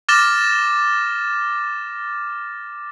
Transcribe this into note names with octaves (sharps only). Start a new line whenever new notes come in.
D6 F6 A6 A#6 E7 G7